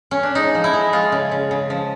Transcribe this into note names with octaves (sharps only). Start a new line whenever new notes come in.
C#4
D4
G#3 D#4
F3
E4
G#3
G#3 F4
C#3
C#3
C#3
F3